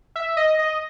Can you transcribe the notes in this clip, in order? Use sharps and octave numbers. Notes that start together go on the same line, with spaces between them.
E5
D#5
D#5